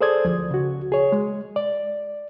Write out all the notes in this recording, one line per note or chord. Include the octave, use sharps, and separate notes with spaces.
G#4 A4 C5 D5 D#6 G#6
D2 F3
C#3 F#4
G#4 C#5
G#3
D5